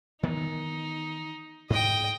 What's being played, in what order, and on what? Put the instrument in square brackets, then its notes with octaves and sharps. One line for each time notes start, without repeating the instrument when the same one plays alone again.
[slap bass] D#3 E3 B3 [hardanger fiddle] D#4
[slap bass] G#2 [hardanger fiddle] D#5 G5